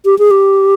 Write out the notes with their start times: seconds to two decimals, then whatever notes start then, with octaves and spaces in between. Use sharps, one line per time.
0.05 G4
0.19 G#4
0.31 G4